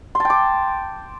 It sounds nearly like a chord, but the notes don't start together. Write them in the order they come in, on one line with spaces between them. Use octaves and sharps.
C6 A5 G5 D6